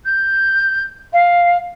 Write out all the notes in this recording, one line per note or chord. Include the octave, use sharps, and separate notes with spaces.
G6
F5